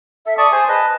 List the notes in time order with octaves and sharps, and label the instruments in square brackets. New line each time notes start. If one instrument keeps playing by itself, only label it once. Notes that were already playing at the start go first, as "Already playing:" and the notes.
[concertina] A4 [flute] E5
[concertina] D5 A5 C#6 [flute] D#6
[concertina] G#4 C5 G#5
[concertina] B4 D#5 [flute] A5